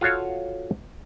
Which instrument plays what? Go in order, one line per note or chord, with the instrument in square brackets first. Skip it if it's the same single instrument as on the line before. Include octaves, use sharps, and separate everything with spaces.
[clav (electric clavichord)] F4 F#4 A4 C#5 F5